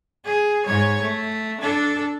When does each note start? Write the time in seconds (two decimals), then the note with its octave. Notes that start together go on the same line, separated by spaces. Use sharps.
0.25 G#4
0.66 G#2 C#5
1.02 A3
1.61 D4 A4